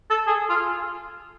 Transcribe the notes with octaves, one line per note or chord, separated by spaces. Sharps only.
A4
G#4
F4